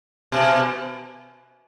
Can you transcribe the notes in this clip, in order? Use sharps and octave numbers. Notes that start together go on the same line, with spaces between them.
B2